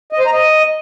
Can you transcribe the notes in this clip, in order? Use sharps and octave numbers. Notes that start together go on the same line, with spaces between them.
D#5
C5
A#5
D#5